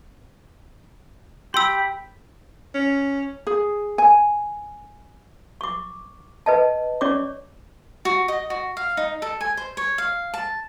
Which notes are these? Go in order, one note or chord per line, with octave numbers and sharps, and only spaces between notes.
G4 G5 B5 C6 E6
C#4
G#4
G#5
C#6 D6
B4 D#5 A5
C#4 C#5 D5 C#6 D6
F#4
D#5
F#4
F5
D#4
A4
G#5
C5
C#5
F5
A5